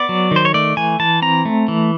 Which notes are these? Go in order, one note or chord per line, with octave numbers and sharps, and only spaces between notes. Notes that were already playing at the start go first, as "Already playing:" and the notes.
Already playing: B3 D5
F#3
D#3 C5
C#5
A3 D5
E3 G#5
E3 A5
C4 A#5
A3
E3